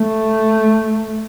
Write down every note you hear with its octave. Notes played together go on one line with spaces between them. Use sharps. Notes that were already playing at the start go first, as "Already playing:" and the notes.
Already playing: A3